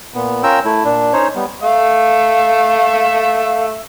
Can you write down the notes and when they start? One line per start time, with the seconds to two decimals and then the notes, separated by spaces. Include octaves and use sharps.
0.14 A#2 B3
0.43 C#4 F4 A#4 G5 E6
0.65 A3 E4
0.84 A#2 D4
1.13 C#4 D#4 C5 C#5
1.35 G3 B3
1.62 A3 E5 F5